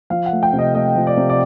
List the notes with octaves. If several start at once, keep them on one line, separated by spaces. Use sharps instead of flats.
F3 F5
F#5
A3
G5
C3
D#5
A3 D#5
F3
D5
C3
D5